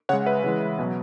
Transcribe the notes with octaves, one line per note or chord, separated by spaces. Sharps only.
C#3 G#3 C#5 F#5
B4 E5
C#3 E3 G#3
B2 F#3